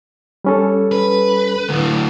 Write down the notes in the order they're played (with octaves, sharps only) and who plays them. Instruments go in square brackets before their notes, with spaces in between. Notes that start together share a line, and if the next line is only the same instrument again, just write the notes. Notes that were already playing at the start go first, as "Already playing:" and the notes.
[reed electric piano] G3 C#4 A4
[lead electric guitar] B4
D2 A2